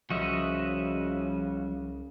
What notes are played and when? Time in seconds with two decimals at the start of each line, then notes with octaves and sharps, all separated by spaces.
0.10 C2 C#3 F3 G3 F#4 D#5 E5